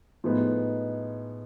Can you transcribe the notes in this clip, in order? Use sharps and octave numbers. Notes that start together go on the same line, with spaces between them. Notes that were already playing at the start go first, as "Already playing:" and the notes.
A2 F3 G#3 B3 D#4